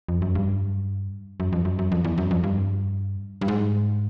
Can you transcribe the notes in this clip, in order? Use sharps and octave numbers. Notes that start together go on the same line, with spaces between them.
F2
F#2
G2
F#2
F2
F#2
F#2
F2
E2
F#2
F2
G2
G2
G#2